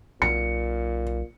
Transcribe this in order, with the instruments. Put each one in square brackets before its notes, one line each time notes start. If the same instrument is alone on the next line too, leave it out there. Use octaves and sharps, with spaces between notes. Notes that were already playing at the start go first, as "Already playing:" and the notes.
[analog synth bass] B1 [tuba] A#2 [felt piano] C#7